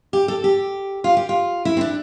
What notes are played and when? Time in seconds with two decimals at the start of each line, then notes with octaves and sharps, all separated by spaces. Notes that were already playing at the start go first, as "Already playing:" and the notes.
0.13 G4
0.28 A4
0.44 G4
1.04 F4
1.17 G4
1.29 F4
1.65 E4
1.77 C4
1.81 D4